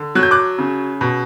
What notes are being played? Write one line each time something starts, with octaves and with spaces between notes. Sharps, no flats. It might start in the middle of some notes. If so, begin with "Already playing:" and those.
Already playing: D3
F#3 F#6
G6
D6 F#6
C#3
B2